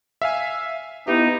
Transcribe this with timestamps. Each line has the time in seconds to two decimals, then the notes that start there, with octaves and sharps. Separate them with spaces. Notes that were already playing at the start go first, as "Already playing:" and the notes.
0.22 E5 F5 G#5
1.08 B3 D#4 E4 G4